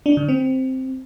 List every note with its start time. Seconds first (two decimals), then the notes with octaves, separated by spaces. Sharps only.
0.06 D4
0.17 D3
0.28 C4